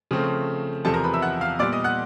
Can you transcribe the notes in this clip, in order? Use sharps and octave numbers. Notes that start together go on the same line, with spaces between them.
C#3 F3 A3 C4
E2 C3 F3 A4 A5
A#4 A#5
B4 B5
E5 E6
F#5 F#6
F5 F6
A#2 G3 B3 D5 D6
D#5 D#6
F#5 F#6